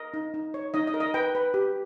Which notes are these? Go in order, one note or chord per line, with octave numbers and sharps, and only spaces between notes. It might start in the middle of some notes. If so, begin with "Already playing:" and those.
Already playing: A#4 D#5
D#4
D#4
C#5
D#4 D#5
D#5
A#4
D#5
B4 G5
B4
G4